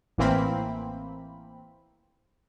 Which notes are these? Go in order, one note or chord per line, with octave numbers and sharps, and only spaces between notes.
A1 E3 A#3 C4 B5